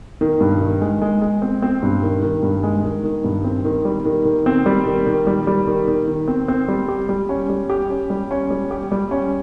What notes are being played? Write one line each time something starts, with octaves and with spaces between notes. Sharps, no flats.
D#3
G2
D#3
G#3
G#3
G#3
C4
C4
G2
D#3
D#3
G2
G#3
D#3
D#3
G2
C4
D#3
G3
D#3
D#3
C4
G3
D#3
D#3
G3
G3
D#3
D#3
D#3
C4
C4
G3
G4
G3
C#4
G3
G4
C#4
G3
C#4
G3
G4
G3
C#4